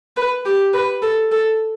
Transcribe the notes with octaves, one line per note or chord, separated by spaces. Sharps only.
B4
G4
B4
A4
A4